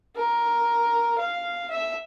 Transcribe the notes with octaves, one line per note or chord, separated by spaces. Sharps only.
A#4
F5
E5